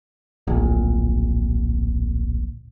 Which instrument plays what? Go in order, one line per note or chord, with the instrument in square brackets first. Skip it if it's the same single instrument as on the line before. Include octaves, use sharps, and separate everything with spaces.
[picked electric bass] D1 A#1